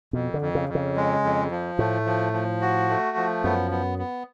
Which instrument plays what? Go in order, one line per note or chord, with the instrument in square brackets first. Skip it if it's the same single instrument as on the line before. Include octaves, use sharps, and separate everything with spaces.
[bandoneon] F2 [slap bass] B2
[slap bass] D3
[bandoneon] F2
[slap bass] C#3
[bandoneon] F2
[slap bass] C#3
[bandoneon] G#3
F2
F3
[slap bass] A2 [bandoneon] A3
[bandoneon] F3
F3
F#4
A3
F3
[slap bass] F#2 [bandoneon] B3
[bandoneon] B3
B3